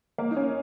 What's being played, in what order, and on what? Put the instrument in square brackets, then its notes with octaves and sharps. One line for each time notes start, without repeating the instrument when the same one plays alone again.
[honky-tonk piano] A#3
D#4
C#4